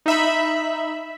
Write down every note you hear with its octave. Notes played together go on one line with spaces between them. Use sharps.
D#4 E5 B5